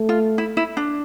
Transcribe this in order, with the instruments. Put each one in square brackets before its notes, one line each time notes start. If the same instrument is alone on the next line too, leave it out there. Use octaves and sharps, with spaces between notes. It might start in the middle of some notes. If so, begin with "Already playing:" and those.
Already playing: [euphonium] A3
[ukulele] F4
E4
E4
D4